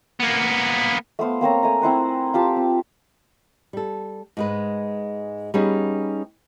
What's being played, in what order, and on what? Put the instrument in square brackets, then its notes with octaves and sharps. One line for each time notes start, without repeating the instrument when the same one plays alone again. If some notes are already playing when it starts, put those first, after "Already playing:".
[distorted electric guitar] A#3 B3
[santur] A3 B3 C5 F5
A#3 C4 C#5 A#5
A3 G#5 A#5
C4 E4 C5 F#5
F4 G4 A5
C4
[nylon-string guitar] G3 A4
G#2 G#3 B4
G3 B3 C#4 D#4 G#4